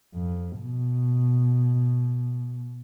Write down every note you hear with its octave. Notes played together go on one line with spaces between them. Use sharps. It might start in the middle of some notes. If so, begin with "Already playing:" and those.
F2
B2